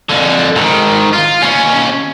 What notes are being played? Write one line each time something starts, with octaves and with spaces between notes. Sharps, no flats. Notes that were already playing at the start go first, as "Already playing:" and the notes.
F2 D3
G#2 D#3
F4
D#2 C#4